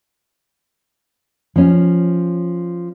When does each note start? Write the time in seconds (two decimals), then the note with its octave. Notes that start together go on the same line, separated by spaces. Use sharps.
1.56 F3 C#4